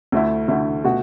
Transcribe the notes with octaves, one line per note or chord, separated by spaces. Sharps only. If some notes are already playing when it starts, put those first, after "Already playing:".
D2 D3 A3 E4
D2 D3 A3 E4
B2 A3 F#4